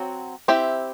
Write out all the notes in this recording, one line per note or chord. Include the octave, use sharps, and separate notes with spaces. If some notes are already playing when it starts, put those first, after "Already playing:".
Already playing: F#3 C4 F#4
C4 E4 G4 C5 E5